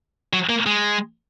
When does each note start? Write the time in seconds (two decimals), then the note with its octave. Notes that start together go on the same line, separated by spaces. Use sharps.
0.33 F#3
0.49 A#3
0.66 G#3